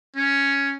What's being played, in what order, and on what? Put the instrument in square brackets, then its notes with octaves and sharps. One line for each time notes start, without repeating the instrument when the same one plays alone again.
[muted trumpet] C#4